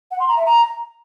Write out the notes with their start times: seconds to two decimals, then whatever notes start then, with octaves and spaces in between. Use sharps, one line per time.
0.11 F#5
0.20 C6
0.28 A#5
0.37 E5
0.46 A#5